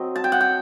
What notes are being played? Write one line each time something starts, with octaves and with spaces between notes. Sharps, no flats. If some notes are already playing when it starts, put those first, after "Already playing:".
Already playing: F#3 C4 D#5
A5
G5
F#5
G5